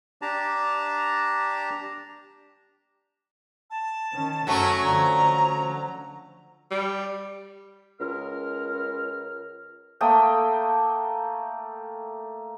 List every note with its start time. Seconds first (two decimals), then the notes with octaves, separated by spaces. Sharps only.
0.22 D4 G4 A5 A#5
3.70 A5
4.13 D#3 C#4
4.47 F#1 F#2 F#3 A3 C#4
4.83 D3 F3 A#5
6.71 G3
8.01 C#2 A#4 F6
10.01 A3 A#3 G5 D#6